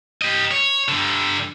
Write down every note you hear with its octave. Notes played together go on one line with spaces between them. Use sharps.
G4 D#5
C#5
G2 D3